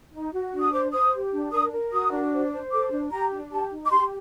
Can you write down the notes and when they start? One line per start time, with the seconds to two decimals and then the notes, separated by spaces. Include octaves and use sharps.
0.12 D#4
0.32 F#4
0.52 D4
0.61 D#6
0.72 C5 D6
0.92 C5 D#6
1.13 G4
1.32 D4
1.52 A#4 D#6
1.72 A#4
1.92 F#4 D#6
2.11 D4
2.32 C5
2.52 C5
2.71 A4 D6
2.91 D4
3.11 G4 A#5
3.32 D4
3.51 G4 A5
3.71 D#4
3.85 D6
3.90 G4 C6